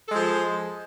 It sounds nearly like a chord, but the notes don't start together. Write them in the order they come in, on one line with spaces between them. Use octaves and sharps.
A4 G#3 F3